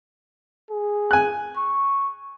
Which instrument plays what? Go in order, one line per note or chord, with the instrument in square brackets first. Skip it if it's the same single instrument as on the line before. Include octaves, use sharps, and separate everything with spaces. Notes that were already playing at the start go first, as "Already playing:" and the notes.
[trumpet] G#4
[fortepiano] G#5 F#6
[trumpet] C#6